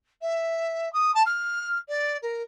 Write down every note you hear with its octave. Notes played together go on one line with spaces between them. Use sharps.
E5
D#6
A5
F6
D5
A#4